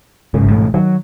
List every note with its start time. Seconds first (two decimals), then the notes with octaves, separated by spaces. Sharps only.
0.34 G1 G#2 C#3
0.50 E1 E3 A3
0.74 D#3 F#3